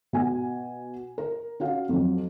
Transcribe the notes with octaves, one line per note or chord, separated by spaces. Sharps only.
B2 G#5
A#4
C#4 F#4 F5
F2 F#3